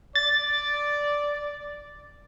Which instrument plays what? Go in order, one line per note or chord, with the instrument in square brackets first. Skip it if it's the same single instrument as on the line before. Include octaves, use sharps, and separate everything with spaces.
[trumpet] D5 [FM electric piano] A6